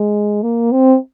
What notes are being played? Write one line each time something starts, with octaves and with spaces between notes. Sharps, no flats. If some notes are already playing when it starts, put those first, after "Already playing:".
Already playing: G#3
A#3
C4